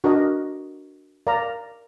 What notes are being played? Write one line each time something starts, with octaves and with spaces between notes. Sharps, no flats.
D4 F#4 A#4 D#5
A#4 D5 F5 A#5